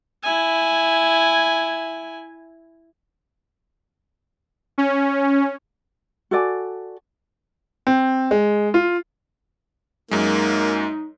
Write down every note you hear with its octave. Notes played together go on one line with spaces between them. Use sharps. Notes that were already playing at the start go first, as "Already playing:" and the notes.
E4 G#5
C#4
F#4 A4 D5 G#5
C4
G#3
F4
F#2 G#3 A#3 D#4